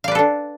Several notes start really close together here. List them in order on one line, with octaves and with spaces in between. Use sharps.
F5 D5 B4 A4 D4